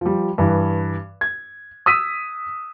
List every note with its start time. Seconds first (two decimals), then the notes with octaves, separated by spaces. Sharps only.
0.01 F3 G3
0.38 G2 E3
1.21 G#6
1.86 D#6 E6 B6 D#7